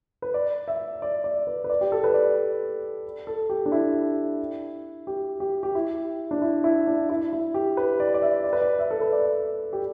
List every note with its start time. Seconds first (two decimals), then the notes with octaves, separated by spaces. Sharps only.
0.22 B4
0.34 D5
0.68 E5
1.02 D5
1.24 D5
1.47 B4
1.64 B4
1.70 D5
1.81 G4
1.92 A4
2.04 B4
2.14 D5
3.27 A4
3.50 G4
3.66 D4
3.72 E4
5.07 G4
5.40 G4
5.63 G4
5.75 E4
6.31 D4
6.42 E4
6.64 E4
6.87 D4
7.10 E4
7.33 E4
7.54 G4
7.77 B4
8.00 D5
8.14 D5
8.22 E5
8.44 D5
8.53 B4
8.62 D5
8.79 E5
8.91 A4
9.01 B4
9.13 D5
9.73 G4